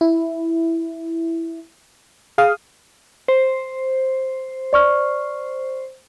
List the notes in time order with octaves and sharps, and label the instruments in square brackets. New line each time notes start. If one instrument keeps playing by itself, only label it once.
[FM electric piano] E4
G#4 F5 D#6
[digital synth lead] C5
[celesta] D5 C#6 F6